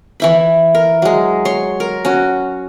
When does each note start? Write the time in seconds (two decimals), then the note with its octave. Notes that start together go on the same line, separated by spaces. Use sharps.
0.20 E3 E4 B5
0.75 A#4
1.02 F#3 G#3
1.45 C#5 C6
1.80 A#4
2.05 C#4 F#4